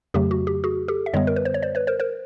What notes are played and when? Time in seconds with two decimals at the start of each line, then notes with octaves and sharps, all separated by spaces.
0.14 F2 C#3 F#3 A3 G4
0.31 F#4
0.47 G4
0.64 F#4 G#4
0.88 G4 A4
1.06 E5
1.13 F#2 D3 G3 B3 C#5 D#5
1.27 A#4
1.36 B4
1.45 C5
1.54 C#5
1.62 C5 D5
1.75 B4 C#5
1.87 A#4 C5
2.00 A#4 C5